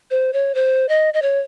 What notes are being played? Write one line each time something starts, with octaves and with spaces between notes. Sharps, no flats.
C5
C#5
C5
D#5
D#5
C#5